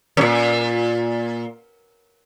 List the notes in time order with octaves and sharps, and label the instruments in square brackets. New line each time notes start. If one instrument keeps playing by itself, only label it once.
[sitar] F#2 A#2